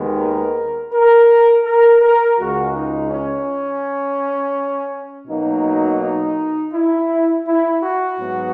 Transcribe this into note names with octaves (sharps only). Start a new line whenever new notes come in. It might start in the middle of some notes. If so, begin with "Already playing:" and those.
Already playing: D#2 D#3 G#3 B3
A#4
A#4
A#4
A#4
C#2 C#3 G#3 F#4
D#4
C#4
B2 F#3 A#3 D#4
D#4
E4
E4
F#4
G#2 F#3 B3